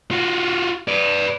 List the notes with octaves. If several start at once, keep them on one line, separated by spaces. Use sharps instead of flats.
F4 F#4
B4 D5